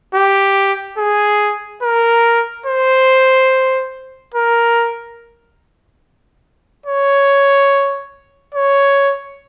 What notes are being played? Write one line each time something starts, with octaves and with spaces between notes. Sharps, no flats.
G4
G#4
A#4
C5
A#4
C#5
C#5